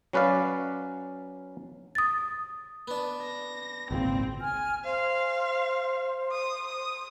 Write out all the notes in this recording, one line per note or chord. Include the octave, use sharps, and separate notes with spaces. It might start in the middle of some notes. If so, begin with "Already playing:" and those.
F#3 C#4 B4 D5 F5
D#6 A6
B3 D4
A#6
G#1 C#2 A#2 C4
G#5 F6
C5 F5
D#6
D#6